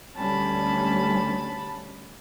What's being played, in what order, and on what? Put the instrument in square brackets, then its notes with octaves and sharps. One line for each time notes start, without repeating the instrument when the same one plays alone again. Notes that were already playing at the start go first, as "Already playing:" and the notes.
[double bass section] D2 G3 C#4 [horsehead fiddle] A5 B5